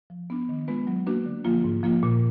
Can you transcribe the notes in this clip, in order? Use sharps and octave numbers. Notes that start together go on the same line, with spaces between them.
F3
B3 D4
D#3
G#3 B3 F4 B4
F#3
A#3 D4 F#4 B4
D3
F3 A#3 F4
G#2
F3 A#3 F4
A#2